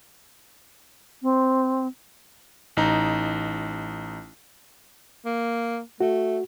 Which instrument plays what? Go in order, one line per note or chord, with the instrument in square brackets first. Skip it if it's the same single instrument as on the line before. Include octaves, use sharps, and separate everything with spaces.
[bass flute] C4
[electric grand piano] A1 D#4 A#5
[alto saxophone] A#3
[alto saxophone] A3 [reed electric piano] F#4